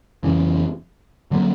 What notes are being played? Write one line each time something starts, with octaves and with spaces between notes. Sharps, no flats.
F2 C#3 E3
D3 F#3 A#3